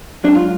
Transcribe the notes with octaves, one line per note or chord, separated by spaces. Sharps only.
G#2 F#3 D4
F4